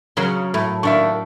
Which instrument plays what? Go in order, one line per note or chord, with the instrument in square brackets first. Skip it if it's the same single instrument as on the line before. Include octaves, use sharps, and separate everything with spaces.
[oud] C#3 [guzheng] F#3 C6 [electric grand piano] A#4
[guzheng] A2 [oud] A3
[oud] D3 D#3 A#3 [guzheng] D4 [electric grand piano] E5 C#6